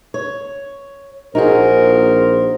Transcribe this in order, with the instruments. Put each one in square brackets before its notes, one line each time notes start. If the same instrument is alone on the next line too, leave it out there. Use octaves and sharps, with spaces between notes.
[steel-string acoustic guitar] C#5
[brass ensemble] A#1 C5 [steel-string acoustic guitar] D#4 F#4 G#4 [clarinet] A#4